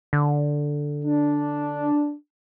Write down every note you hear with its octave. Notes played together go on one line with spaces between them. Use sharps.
D3
D4